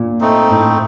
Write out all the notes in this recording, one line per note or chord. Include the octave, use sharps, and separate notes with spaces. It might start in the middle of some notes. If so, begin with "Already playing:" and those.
Already playing: A#2
A3 C4 D#4
A2